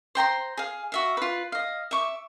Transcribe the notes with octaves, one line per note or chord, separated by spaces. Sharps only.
C5 G5 A#5 C6
G#4 F5
F#4 E5 F5
F4 B4
D#5 F5
E5 C#6 D6